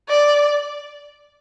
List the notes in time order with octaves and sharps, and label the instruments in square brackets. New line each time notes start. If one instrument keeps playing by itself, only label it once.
[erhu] D5